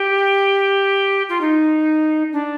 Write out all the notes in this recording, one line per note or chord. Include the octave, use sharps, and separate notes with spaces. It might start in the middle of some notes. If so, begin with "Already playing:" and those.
Already playing: G4
F4
D#4
D4